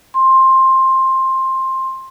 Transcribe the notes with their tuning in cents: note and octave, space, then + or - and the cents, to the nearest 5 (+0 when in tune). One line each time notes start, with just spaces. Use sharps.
C6 +15